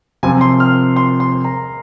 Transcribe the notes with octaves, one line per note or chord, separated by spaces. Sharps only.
C3 F3 C4 F4 G#5
C6
F6
C6
C6
A#5